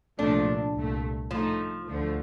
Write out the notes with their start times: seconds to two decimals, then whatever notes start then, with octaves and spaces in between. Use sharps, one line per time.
0.18 C2 A#2 F3 A3 D4
0.74 C2 A#2 A3
1.31 A2 F3 A3 D#4
1.87 D2 D3 F3 A3